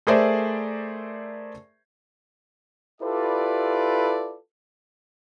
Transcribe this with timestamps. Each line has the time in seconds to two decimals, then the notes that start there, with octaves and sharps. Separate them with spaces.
0.07 A3 G#4 A#4 C5 D5 E5
3.01 E4 F4 G4 A4 B4 D5